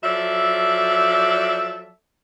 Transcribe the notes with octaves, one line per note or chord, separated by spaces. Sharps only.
F3 F#3 A4 D5 E5